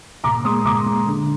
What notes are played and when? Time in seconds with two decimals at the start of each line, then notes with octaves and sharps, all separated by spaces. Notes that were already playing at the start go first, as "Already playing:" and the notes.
0.24 A#2 A#5 D6
0.44 G#3 C6 D#6
0.65 A#2 A#5 D6
0.86 G#3
1.06 D3